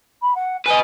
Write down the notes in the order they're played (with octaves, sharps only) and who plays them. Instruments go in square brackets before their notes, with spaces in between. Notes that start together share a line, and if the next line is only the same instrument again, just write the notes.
[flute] B5
F#5
[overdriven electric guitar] B4 D#5 [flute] G#5